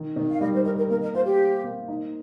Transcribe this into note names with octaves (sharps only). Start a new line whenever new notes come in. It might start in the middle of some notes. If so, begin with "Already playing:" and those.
Already playing: D#3
D#3
F5
G3 A#4 D#5
C5
D#4 A#4
A#4
A#3 A#4
A#4 D#5
F4 C5
G4
C5
A#3
D#4